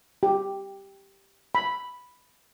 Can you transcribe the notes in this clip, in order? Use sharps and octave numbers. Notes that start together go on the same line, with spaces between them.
G4
B5